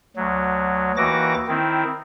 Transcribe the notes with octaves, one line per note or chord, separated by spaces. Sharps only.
D2 F#3
D#2 E3 F#4 D6 A#6
D#3 C4 E4